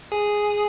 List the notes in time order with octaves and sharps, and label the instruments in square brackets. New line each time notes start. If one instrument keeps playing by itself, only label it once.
[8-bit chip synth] G#4